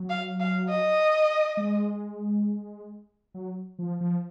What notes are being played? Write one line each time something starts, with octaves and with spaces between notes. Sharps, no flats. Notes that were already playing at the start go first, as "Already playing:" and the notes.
Already playing: F#3
F5
F5
D#5
G#3
F#3
F3
F3